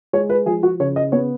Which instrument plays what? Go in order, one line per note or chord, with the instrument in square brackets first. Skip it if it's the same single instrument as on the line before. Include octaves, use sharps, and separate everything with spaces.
[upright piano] G#3 C#5
B4
F3 G#4
F#4
C#3 C#5
D#5
B3 C#5